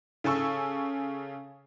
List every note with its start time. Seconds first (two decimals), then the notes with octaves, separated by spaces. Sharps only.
0.24 C#3 A4 G#5 C#6 E6